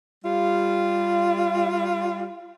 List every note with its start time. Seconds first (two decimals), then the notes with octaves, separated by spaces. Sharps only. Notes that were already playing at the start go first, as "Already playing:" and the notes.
0.24 G3 F4